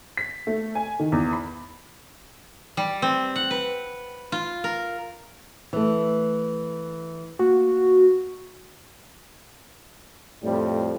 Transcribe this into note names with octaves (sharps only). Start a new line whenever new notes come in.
B6
A3
G#5
D#3
E2
B5
G3
C4
F#5
B4
F4
A#4
E3 A3
A#3 F#4
F2 A2 G3